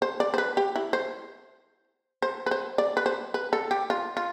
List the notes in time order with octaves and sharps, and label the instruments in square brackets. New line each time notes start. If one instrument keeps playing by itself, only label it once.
[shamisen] C5
D5
C5
B4
G4
E4
C5
C5
B4
C5
D5
B4
C5
B4
A4
G4
F4
F4